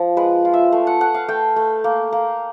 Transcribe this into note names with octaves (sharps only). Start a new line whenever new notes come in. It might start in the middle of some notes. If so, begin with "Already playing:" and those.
Already playing: F3
G#3 B4
F4
E5
A3 F5
F#5
A3 F#5
F5
A3 G5
A3
A#3
A#3